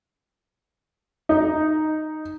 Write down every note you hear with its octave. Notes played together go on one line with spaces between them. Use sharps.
D#4